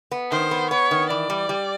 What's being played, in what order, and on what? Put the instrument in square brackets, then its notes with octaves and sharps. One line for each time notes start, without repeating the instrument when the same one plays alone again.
[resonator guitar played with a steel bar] B3
[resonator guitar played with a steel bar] D#3 [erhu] C5
[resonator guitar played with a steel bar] B3
[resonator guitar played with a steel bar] B3 [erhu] C#5
[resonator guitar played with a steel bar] D#3
[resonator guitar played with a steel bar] E3 [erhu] D5
[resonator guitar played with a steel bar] G3
G3